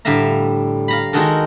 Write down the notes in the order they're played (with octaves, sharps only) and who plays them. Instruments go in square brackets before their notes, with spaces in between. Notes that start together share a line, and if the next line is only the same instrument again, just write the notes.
[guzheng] A2 D3 G3 E5 F5 A#5
F5 A#5 B5
D#3 G#3 D#4 F#4 A4 A#4